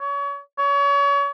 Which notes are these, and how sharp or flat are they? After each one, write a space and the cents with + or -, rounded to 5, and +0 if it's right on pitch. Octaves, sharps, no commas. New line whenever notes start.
C#5 +35
C#5 +35